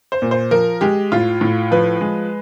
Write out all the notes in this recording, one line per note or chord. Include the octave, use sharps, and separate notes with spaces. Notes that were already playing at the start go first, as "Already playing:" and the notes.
C5
A#2
C5
F3 A#4
G#3 G4
A2 F4
A2
F3 B4
G#3